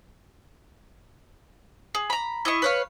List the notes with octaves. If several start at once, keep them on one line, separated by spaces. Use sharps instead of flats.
G#4
A#5 B5
E4 D#5 C#6
B4 C#5 F5